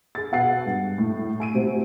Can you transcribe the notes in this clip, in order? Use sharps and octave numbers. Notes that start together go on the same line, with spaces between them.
G#4 A6
B2 F#5 A6 C7
G2
A2 A3
G#5 D7 D#7
A2 C3 C4 F#4